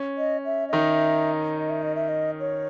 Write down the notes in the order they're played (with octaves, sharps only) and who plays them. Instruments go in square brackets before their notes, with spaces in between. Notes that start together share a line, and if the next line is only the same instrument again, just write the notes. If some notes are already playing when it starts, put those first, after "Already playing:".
Already playing: [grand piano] C#4
[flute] D#5
E5
D#5
[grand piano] D#3 D#4 [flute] E5
[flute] D#5
E5
D#5
E5
D#5
C#5